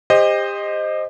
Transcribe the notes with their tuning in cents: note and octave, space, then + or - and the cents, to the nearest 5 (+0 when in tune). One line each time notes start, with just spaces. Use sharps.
G4 +35 C5 +5 D#5 -5